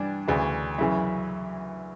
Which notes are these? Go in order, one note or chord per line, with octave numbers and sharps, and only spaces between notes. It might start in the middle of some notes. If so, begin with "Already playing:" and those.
Already playing: G2 E3 D4
D2 C#3 E3
F#2 C#3 E3 E4